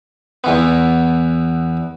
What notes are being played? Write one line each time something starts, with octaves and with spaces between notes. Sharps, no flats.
E2 E3 B3